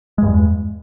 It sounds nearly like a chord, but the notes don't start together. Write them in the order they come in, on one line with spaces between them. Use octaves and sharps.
G#3 G2 E2